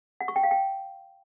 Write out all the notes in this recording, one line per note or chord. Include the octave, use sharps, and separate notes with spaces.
F#5
C#6
G5
F5
G5